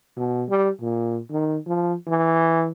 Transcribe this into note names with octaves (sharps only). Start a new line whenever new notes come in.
B2
G3
A#2
D#3
F3
E3